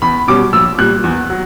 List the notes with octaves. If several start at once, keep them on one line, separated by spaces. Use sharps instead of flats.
E2 B5
B2 G3 C#4 D6
A#1 E6
A#2 G3 F#6
E2
F#3